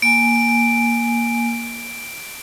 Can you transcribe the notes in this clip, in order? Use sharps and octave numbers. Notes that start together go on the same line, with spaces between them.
A#3 G#5 D7